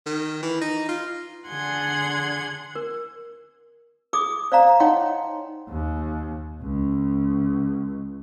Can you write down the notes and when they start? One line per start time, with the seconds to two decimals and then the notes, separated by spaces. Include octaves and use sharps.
0.06 D#3
0.43 E3
0.61 D#4
0.89 F4
1.48 D3 D4 G#4 F#5 C6 G#6
2.75 A#4
4.13 G#4 D6 D#6
4.52 C5 D5 F5 A#5
4.80 D#4 C#5 D#5 F#5 G5 C6
5.69 D#2
6.62 C#2